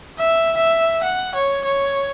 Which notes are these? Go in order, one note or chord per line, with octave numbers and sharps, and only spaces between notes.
E5
E5
F#5
C#5
C#5